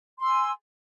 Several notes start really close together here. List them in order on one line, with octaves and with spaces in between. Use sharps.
C6 E6 G#5